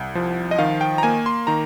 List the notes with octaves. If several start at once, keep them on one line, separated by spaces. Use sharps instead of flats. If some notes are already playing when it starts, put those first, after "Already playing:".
Already playing: C2
F3
D#5
D#3 F5
G5
A#5
A#3 G#5
C6
D#3 A#5